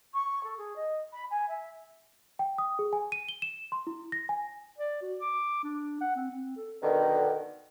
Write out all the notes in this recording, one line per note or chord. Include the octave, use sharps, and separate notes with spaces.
C#6
A4
G#4
D#5
B5
G#5
E5
G5
D#6
G#4
G#5
D#7
G7
E7
C6
E4
A#6
G#5
D5
F#4
D6
D4
F#5
C4
C4
A4
B2 D3 D#3